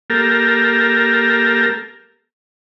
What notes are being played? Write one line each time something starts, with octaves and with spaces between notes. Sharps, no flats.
A#3 G4 A4 A#4